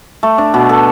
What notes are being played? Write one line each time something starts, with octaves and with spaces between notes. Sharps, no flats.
A3
D4
B2
A4